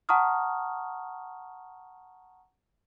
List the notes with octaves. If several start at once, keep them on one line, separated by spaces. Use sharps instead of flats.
F#5 A5 A#5 C#6 D#6 F6